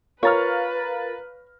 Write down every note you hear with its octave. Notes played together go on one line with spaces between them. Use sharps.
F4 A#4 B4 C#5 F5 A#5 F6 A6